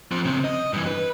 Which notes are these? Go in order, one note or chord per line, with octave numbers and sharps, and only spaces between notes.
F3 C4
C#3 C4
D#5
G2 E3
B4